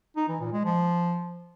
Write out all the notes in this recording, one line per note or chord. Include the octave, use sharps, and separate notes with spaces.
D#4
E3
A#2
G#3
F3